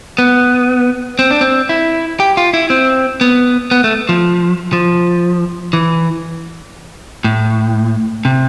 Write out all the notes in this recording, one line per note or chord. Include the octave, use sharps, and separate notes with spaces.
B3
C4
D4
C4
E4
G4
F4
E4
C4
B3
B3
A3
F3
F3
E3
A2
C3